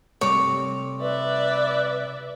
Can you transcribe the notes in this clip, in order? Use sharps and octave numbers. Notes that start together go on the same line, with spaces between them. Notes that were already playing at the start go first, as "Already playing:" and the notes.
C3 G3 A3 C#5 D6
B4 D5 E5